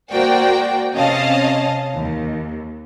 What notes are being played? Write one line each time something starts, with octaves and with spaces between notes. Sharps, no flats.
A#3 F#4 C5 D5 G5
C3 C#4 D#5 F5 A5
D#2